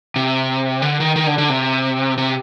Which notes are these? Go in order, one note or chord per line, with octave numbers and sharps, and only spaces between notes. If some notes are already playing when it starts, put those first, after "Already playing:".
C3
D3
D#3
D#3
D3
D3
C3
C3